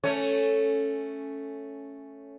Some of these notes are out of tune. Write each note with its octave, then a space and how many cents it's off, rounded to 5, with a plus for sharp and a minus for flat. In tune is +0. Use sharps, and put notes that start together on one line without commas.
A3 +0 C#4 +0 C#5 +0